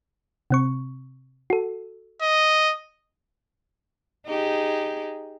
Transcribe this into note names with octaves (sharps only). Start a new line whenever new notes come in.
C3 C4 C#6
F#4 A4
D#5
D#4 G4 G#4